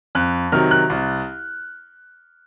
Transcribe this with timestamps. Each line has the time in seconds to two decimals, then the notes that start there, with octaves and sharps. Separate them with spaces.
0.15 F2 F#6
0.52 C3 D#3 F#3 F6
0.71 F#6
0.90 C2